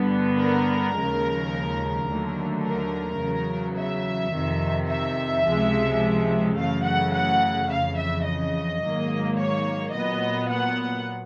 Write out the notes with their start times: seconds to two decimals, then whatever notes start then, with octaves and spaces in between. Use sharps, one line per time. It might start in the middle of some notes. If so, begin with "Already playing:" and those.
Already playing: G2 D3 G3 B3
0.41 A#4
0.97 D#2 C#3 F3 G#3
2.09 D#2 D3 F#3 A3
2.65 A#4
3.21 E2 C#3 F#3
3.78 E5
4.34 F2 C3 D#3
4.90 E5
5.46 C#2 C3 F3 G#3
6.58 F#2 C#3 E3 A3 F5
6.86 F#5
7.14 F#5
7.70 F2 C#3 E3 F5
7.99 E5
8.27 D#5
8.82 G#2 D#3 F#3 A#3
9.38 C#5
9.94 A#2 F#3 B3 D#5
10.51 F#5